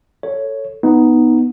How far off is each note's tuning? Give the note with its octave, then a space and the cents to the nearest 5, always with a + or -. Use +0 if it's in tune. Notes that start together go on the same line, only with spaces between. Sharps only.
A4 +10 C#5 +0
B3 +0 D#4 +0